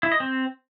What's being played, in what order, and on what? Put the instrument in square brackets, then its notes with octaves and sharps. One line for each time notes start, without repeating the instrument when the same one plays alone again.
[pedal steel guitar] E4
D#5
C4